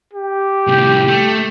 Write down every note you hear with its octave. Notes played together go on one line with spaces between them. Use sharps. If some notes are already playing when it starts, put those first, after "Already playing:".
G4
C2 A2
A3